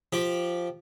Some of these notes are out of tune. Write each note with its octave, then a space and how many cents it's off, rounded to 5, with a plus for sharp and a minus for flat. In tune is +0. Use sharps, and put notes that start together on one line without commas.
F3 +0 G4 +0